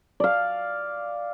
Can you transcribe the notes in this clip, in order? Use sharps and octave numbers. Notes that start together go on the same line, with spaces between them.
D5 F5